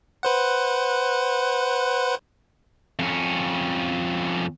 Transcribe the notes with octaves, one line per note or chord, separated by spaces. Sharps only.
B4 C5 F#5
F2 C#4